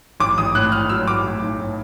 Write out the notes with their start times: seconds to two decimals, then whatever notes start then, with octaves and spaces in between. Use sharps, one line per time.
0.20 A1 D6
0.38 A1 D#6
0.54 A2 F#6
0.72 A2 F6
0.89 F#3 E6
1.07 A2 D6
1.25 A2
1.42 B1
1.60 A2